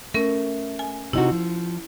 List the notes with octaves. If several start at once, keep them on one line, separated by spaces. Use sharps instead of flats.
A3 C#4 A#4
G#5
C3 D#4 E4 F#4
F3